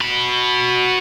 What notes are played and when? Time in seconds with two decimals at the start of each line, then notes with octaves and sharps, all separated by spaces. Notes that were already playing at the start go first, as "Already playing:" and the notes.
0.01 F#4 B5